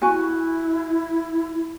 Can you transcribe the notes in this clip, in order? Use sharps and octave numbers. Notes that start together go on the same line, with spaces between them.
E4 F#4 G#5